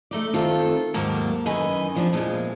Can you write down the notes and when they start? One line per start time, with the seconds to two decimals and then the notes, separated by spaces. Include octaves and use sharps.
0.11 A3 D#4 D5
0.33 D#3 C4 F4 A4
0.94 D#2 G#2 F#3 A#3 A5
1.46 F#2 D#3 E3 B4 D#5 G#5
1.95 F2 F3 D4
2.13 E2 A#2 F3 G#3